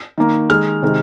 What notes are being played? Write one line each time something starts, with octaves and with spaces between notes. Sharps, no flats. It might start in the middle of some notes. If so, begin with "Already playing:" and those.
D#3 A#3
D#3 G#3 F6
C3 D#3 G#3